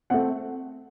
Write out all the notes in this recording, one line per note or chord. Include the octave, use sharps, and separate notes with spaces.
A3 C4 F#5